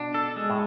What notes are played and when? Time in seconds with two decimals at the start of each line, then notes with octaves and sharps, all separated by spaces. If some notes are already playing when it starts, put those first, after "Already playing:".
Already playing: B2 D4
0.14 A4
0.36 G#3
0.50 A2